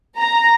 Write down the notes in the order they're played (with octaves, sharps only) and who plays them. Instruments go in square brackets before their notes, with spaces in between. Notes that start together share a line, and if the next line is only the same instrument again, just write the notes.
[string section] A#5